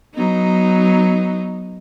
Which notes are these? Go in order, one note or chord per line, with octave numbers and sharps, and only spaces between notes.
F#3 B3 D#4